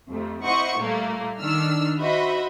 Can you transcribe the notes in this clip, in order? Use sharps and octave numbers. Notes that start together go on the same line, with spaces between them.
F2 C3 A3
E4 C5 D#5 F#5 C#6 C#7
A#2 G3 A3 A#3
D#3 D4 E6 F6
F#4 C5 D#5 E5 B5